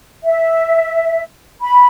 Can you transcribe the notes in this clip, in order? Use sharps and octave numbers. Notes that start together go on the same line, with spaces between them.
E5
B5